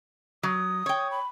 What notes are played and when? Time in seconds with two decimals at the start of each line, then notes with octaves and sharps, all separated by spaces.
0.43 F#3 D#6
0.86 C#5 G5
1.11 B5